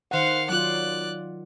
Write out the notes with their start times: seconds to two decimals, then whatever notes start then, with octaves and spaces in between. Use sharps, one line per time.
0.11 D#3 C5 F5 F#5
0.49 F#3 F4 D5 F#6